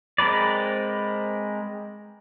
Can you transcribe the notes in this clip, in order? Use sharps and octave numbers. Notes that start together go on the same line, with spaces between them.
G#3 C4 A#4 B4 D5